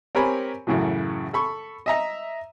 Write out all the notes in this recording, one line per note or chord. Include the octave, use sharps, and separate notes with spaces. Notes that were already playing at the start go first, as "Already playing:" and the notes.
C4 G4 A#4 C#5 G#5 B5
F#2 A2 C#3 E3 F#3
A4 B5 C#6
D#5 E5 A#5